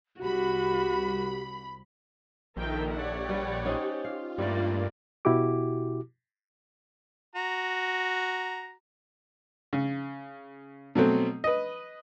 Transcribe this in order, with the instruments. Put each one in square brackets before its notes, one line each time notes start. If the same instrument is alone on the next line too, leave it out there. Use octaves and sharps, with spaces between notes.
[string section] C2 B5 [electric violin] F#4 [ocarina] G4
[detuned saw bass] A#1 [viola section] D#3 A#4 G5 [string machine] D#4 A4 E5
[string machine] G4 [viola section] C#5 D5 F#5
[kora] G3 B4
C#4 D#4 C5
[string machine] F4 [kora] F5
[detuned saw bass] G2 [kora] G3 A3 [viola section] A#3 D5
[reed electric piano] B2 E4 F#4 G4 D6
[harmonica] F#4 A#5
[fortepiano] C#3
B2 F#3 A3 C4
B4 D#5